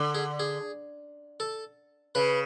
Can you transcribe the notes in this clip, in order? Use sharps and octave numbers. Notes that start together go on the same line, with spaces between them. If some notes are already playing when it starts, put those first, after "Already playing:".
Already playing: D3
G#4
G#4
A4
C#3 B4